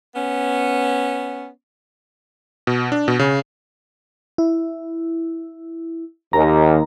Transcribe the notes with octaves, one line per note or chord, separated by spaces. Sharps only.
B3 C#4
B2
D4
B2
C#3
E4
D#2 A#5